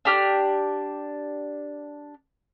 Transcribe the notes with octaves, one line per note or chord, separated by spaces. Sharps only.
D4 G4 F6